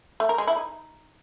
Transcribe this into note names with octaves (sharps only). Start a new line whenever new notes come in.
A3
A#4
G#3
E4
D#4